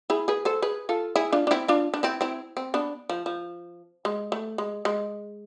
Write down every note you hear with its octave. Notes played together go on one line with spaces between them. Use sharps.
E4 G#4
G#4 B4
A4 C5
G#4 B4
F4 A4
E4 G#4
D4 F4
D4
C4 E4
D4 F4
D4
C4 E4
C4 E4
C4
B3 D4
F3
F3
G#3
A3
G#3
G#3